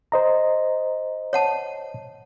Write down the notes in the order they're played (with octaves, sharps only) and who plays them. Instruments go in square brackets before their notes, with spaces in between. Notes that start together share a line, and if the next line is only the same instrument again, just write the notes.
[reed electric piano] C5 D#5 A#5
[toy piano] C#5 F#5 A5